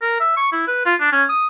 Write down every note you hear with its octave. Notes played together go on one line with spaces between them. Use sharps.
A#4
E5
C#6
E4
B4
F4
D4
C#4
D#6